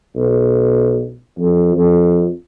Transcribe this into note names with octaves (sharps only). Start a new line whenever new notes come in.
B1
F2
F2